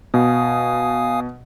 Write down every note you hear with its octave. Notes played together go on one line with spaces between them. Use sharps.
B2 F5 G#5 D#6